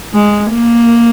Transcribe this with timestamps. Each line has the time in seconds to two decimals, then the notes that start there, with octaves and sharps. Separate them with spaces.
0.13 G#3
0.52 A#3